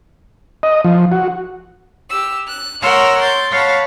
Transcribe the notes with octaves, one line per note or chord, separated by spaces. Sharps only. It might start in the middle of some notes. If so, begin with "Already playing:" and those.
D#5
F3
F#4
G4 E6
F#6
A#4 C#5 F#5 C6 E6 F6
C6 G6 A6
C#5 F5 F#5 A5 B5